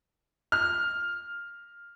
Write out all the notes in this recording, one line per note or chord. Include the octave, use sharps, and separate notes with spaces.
F6